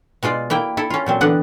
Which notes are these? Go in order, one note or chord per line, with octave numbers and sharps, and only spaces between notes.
B2 G#3 F4 D5
A#3 E4 G5
E4 A4
C#4 F4
A#2 F#3 C4
D3 E3 B3 D4 F#5